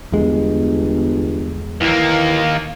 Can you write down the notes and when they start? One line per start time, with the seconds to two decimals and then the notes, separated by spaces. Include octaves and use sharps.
0.12 G1 E2 G#3
1.81 D#2 E3 A#3